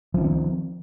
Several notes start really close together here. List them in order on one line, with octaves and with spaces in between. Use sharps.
F3 C#4 D#3 C4